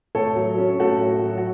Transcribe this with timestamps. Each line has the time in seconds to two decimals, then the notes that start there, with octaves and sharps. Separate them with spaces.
0.15 A2 A4 C#5
0.36 F#3
0.58 C#4
0.79 A2 F#4 A4
1.01 A2
1.23 F#3
1.38 F#4